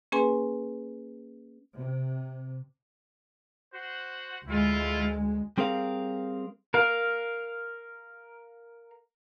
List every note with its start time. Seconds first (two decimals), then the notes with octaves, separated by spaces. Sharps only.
0.12 A#3 C#4 G#4 B4 G#5 C6
1.77 C3
3.74 F#4 C5 F#5
4.48 D2 G#3 E4 F4
5.58 G3 C4 G#4 A#4 F5
6.74 A#4 F5